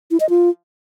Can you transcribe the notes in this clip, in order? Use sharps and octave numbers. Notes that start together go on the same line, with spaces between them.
E4
D#5
F4